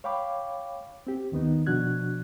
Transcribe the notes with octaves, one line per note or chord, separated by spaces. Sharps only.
C#5 F5 G5 B5 D6
C4 G4
D#2 D#3 B3 D#4
B2 F3 D4 F#4 F#6 G#6